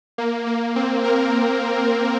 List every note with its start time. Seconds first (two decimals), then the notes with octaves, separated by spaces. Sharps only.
0.18 A#3
0.47 A#3
0.76 C4
1.04 A#4